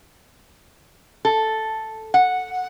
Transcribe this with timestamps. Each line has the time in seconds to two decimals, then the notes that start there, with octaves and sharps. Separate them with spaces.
1.25 A4
2.14 F#5